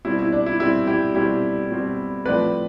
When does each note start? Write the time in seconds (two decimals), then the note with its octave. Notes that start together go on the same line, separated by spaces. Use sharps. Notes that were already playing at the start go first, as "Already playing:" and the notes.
0.05 B2 G3 C4 E4
0.19 E4
0.32 D4
0.46 E4
0.60 B2 G3 C4 E4
0.87 E4 G4
1.15 B2 G3 C4 E4 G4
1.70 B2 G3 C4
2.25 A2 F3 A3 C4 B4 D5